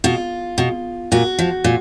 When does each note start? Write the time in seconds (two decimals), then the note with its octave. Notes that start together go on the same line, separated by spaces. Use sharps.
0.04 B2 F4
0.58 B2
1.12 A#2 F#4
1.38 F3
1.64 A#2